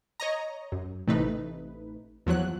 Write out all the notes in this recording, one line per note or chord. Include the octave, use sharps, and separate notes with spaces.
C#5 D#5 A#5
F#2
A1 C3 A3 D#4 B4
E2 F3 F#3 F#6